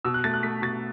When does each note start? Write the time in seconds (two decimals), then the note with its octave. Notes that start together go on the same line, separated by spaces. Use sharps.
0.05 B2 E6
0.14 F#6
0.24 A3 A6
0.34 F#6
0.43 A3 B6
0.62 B2 A6